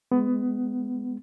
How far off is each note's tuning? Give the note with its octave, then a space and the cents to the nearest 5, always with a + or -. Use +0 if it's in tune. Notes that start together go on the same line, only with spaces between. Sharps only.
G#3 +5 B3 +20